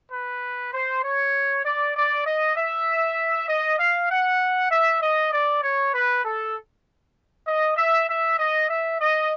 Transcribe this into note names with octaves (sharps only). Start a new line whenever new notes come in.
B4
C5
C#5
D5
D5
D#5
E5
D#5
F5
F#5
E5
D#5
D5
C#5
B4
A4
D#5
E5
E5
D#5
E5
D#5